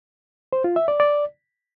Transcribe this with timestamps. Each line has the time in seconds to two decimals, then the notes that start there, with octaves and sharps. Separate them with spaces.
0.53 C5
0.64 F4
0.76 E5
0.88 D5
1.00 D5